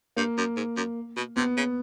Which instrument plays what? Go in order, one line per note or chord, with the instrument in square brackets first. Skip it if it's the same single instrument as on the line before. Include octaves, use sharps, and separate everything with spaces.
[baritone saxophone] G2 [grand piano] A#3
[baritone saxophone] F#2
G#2
F#2
B2
[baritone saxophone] C3 [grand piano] B3
[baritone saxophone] C#3